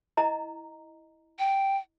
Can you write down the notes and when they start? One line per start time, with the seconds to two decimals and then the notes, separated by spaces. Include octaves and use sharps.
0.17 E4 D#5 A#5
1.39 G5